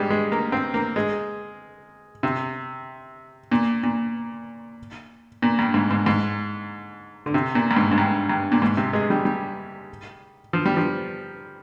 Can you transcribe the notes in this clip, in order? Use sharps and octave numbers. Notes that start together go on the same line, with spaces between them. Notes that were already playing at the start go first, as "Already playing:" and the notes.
Already playing: G#2 G3 G#3
G#3
A#3
C4
A#3
G#3
C3
A#2
A#2
A#2
G2
G#2
G#2
G#2
D3
C3
A#2
G2
G#2
G#2
G2
G2
A#2
G#2
C3
G#3
G3
G3
F3
G3
F3